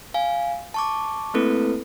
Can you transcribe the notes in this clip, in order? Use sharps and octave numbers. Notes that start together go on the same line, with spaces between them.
F5 G#5
A5 C#6 D6
A3 A#3 C4 E4 A4 B4